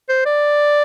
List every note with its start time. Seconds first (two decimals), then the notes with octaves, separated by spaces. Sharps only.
0.09 C5
0.25 D5